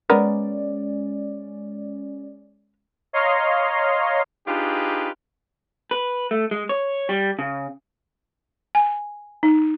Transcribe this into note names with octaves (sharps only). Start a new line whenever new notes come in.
G#3 B3 C#4 A#4 D5
C#5 D#5 F5 A#5 C6
D4 D#4 F4 G4 G#4 B4
B4
A3
G#3
C#5
G3
C#3
G#5
D#4